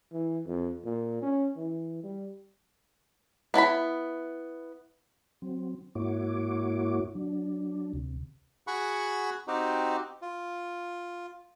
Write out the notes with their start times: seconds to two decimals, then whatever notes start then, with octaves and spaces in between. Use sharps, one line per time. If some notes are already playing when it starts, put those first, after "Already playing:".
0.12 E3
0.46 F2
0.85 A#2
1.22 C#4
1.56 E3
2.03 G3
3.54 B3 E4 A5 B5
5.42 F#3 C4
5.95 G#2 A#3 E4 F#4 C#5 D6
7.15 F#3 D4
7.93 D2 C3
8.67 F#4 G#4 F#5 B5 C#6
9.48 C4 D#4 F#4 G4
10.22 F4